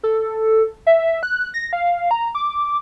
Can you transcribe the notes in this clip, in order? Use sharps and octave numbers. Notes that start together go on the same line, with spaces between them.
A4
E5
F#6
A#6
F5
A#5
D6